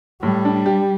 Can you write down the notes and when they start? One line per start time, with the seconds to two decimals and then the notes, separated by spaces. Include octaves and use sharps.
0.23 A2 G3
0.45 D4
0.66 G4